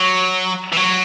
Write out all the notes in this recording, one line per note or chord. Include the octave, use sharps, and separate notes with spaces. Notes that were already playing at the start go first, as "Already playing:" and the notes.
Already playing: F#3
E3
F#3